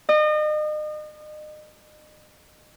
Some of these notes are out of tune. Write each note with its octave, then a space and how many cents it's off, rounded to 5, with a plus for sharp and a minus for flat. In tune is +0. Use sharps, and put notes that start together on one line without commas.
D#5 -35